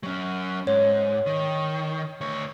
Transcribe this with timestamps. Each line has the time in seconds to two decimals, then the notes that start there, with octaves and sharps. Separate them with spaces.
0.03 F#3 C#4
0.67 G#2 C#5
1.26 D#3
2.21 D2 C#5